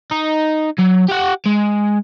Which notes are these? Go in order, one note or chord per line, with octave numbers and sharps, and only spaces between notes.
D#4
F#3
G4 F#5
G#3